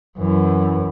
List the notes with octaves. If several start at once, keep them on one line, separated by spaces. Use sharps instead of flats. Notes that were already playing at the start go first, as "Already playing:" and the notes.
F#2 E3